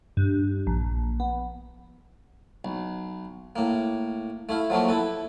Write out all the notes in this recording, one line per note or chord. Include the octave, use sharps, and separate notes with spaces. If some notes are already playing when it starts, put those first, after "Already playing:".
G2
A#1
B3
B1
A2 A#3
A3 E4 F5
F3 F#3 A3 A#3
E4 A4 B4